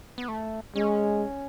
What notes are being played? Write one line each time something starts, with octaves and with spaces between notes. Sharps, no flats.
B3
A3
G#3 C#4